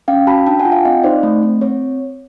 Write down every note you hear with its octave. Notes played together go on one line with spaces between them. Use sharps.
C#4 F5 G5
F#4 A5 B5
D4 G5 A5
F#5 G#5
F4
F5 G5
C4 D#5 F5
D#4 C5 D5
A3
C4
C4 C#5